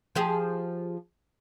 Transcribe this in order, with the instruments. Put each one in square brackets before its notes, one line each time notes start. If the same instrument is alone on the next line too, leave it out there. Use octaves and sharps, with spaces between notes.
[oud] F3 G4 G#4